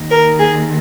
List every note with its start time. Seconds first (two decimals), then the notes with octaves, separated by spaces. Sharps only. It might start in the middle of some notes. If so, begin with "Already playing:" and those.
Already playing: D#2 D#3
0.10 A#4
0.39 G#4